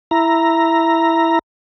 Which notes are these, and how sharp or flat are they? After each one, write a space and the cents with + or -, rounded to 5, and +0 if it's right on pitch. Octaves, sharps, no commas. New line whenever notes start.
E4 +5 A#5 +0